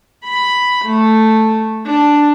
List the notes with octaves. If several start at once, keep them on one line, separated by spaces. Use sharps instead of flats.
B5
A3
D4